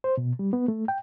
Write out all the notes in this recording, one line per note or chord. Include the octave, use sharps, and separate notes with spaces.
C5
B2
G3
B3
A3
G5